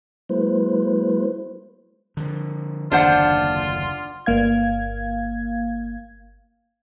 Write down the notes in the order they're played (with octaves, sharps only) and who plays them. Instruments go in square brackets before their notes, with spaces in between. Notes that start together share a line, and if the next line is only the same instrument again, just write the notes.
[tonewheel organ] F#3 G#3 A#3 E4 B4 C5
[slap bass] D3 F3
[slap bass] F#1 D#2 D3 [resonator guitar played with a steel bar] D4 C5 F#5 [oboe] F4
[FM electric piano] G1 A#3 F5 G#6